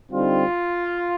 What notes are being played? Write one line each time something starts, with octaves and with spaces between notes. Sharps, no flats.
D3 G3 C4 D#4 F4